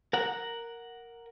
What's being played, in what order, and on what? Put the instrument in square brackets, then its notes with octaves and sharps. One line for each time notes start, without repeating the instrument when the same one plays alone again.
[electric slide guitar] A#4 F#5